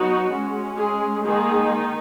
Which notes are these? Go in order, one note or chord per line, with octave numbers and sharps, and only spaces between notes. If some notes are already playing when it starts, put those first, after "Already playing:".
Already playing: F#3 B3 D#4 F#4
G#3 C#4
G#3 G#4
D#3 G#3 A#3 D#4 G#4